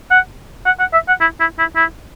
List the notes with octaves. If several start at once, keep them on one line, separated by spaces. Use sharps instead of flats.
F#5
F#5
F#5
E5
F#5
E4
E4
E4
E4